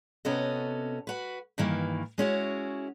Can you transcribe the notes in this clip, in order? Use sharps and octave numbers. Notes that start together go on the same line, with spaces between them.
C3 B3 C#4 F#4 A4 D#5
F#4 B4
G2 D#3 E3 A#3
G#3 C#4 E4 F#4